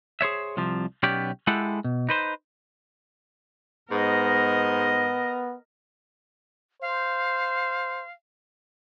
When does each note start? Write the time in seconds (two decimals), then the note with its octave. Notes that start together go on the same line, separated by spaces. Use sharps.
0.21 G#4 C5 C#5 E5
0.57 C2 C3 F3
1.03 B1 B3 C#4 G4 D5
1.47 G#3 E4 G4 A4 F#5
1.84 B2
2.09 D#4 B4 C5
3.91 G#2 B3 A#4 D#5
6.82 C5 F5